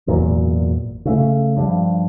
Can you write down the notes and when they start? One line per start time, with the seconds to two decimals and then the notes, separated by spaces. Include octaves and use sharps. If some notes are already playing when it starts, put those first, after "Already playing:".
0.07 G#1 E2 A#2 F#3
1.05 C#3 A3
1.57 G2 F3